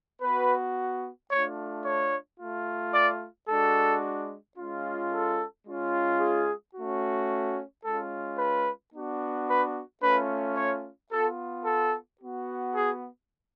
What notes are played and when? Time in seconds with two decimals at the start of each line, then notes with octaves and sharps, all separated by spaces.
0.22 B3 F#4 B4
1.31 A3 D4 F4 C#5
1.85 C#5
2.39 A3 F4
2.94 D5
3.49 G#3 D4 F#4 A4
4.57 G#3 C#4 F4
5.12 A4
5.67 G#3 C#4 F4
6.20 G#4
6.75 A3 C#4 F#4
7.85 G#3 C#4 F4 A4
8.38 B4
8.93 B3 D4 F#4
9.48 B4
10.02 A3 C#4 F4 B4
10.57 C#5
11.11 B3 F4 A4
11.65 A4
12.20 B3 F#4
12.75 G#4